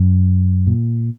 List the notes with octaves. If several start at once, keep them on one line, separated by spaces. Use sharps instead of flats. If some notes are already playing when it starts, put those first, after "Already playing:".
Already playing: F#2
A#2